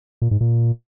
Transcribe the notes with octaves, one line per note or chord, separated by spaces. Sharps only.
A#2
G#2
A#2